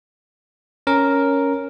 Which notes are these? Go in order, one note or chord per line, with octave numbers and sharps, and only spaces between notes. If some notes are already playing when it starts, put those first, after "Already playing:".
C#4 A#4